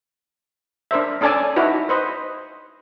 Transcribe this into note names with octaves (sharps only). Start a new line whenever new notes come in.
D4 A#4 C5 E5
C#4 D4 A4 D5 G#5 A5
D#4 E4 F#4 B4
B4 C5 D#5